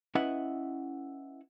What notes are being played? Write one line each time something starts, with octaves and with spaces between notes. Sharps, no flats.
C#4 E4 B4 D#5 E5 F#5